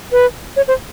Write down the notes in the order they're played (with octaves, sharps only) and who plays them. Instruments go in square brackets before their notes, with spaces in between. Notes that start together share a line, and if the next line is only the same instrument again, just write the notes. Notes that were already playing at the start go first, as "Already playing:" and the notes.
[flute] B4
C#5
C5